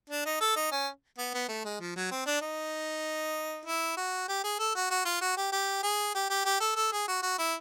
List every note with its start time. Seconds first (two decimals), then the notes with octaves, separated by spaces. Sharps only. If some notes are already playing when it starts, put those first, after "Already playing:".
0.10 D4
0.25 D#4
0.41 A4
0.56 D#4
0.72 C#4
1.18 B3
1.34 B3
1.49 A3
1.65 G#3
1.80 F3
1.96 F#3
2.11 C4
2.26 D4
2.42 D#4
3.66 E4
3.97 F#4
4.28 G4
4.44 G#4
4.59 A4
4.75 F#4
4.91 F#4
5.05 F4
5.21 F#4
5.37 G4
5.52 G4
5.83 G#4
6.15 G4
6.30 G4
6.45 G4
6.60 A4
6.76 A4
6.92 G#4
7.08 F#4
7.23 F#4
7.38 E4